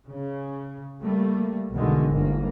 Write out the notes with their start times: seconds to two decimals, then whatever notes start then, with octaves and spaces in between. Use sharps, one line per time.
0.11 C#3
1.02 G3 A3 A#3
1.73 B1 E2 B2 D3 D#3 G#3
2.10 G1 G#2 A#3